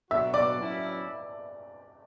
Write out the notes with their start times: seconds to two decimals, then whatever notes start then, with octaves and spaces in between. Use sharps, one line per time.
0.10 B2 F#3 B3 D4 F#4 E5 E6
0.34 D5 D6
0.58 F#3 C#4 E4